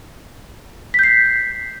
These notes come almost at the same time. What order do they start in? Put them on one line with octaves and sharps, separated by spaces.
B6 G6 C7